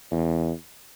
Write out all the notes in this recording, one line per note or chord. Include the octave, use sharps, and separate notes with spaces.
E2